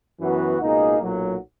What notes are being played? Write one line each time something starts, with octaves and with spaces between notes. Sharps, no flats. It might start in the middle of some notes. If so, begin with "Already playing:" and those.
F#2 E3 B3 F#4
C#2 B2 A#3 D#4 G#4
B1 A#2 F#3